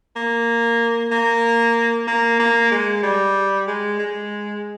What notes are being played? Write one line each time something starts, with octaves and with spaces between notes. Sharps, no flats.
A#3
A#3
A#3
A#3
G#3
G3
G#3
G#3